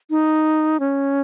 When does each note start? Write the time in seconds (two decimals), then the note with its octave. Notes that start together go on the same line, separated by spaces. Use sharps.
0.10 D#4
0.80 C#4